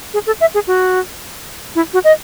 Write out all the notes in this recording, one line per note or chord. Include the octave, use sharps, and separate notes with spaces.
G#4
A4
E5
G#4
F#4
E4
F#4
D#5